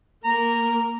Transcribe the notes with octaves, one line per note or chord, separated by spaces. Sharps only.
A#3 A#4 A#5